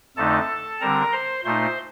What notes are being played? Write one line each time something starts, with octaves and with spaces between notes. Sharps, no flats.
F2 D3 A3 D#4 A4 A5
D3 G3 C4 A#4 A#5
C5 C6
A#2 A3 D#4 C5 C6